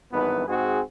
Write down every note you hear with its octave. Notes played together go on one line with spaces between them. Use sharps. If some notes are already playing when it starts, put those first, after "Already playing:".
G#1 G2 E3 B3 D#4 B4
G#2 C4 F#4 G#4